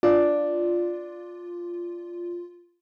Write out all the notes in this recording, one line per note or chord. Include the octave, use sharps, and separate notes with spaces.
D4 F4